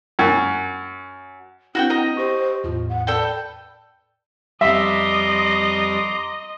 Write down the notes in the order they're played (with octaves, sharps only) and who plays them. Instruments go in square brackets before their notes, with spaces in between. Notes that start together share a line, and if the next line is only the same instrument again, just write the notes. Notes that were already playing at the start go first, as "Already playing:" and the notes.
[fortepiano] F#2
[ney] C4 [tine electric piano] D4 E4 [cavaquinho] F#4 F#5 G5
[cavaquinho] D#5 A#5
[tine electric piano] G4 C#6 [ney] C5
[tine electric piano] E2 A2 [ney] F4
[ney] F#5
[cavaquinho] A4 B4 G5 [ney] D5
[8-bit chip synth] F2 G3 [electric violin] D#5 [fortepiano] E5 [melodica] A#5 C6 D6